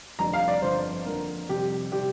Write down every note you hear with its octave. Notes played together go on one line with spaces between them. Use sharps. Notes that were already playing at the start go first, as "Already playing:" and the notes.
F1 F2 D3 G3 C4 A#5
F5
D5
G1 F2 D3 C5
F2 D3 A#3 A#4
F2 C3 G3 C4 G4
C3 G3 G4